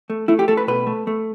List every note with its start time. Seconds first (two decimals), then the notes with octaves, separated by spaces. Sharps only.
0.10 A3
0.28 A3 E4
0.39 G4
0.48 A3 A4
0.57 B4
0.68 B2 B4
0.87 A3
1.07 A3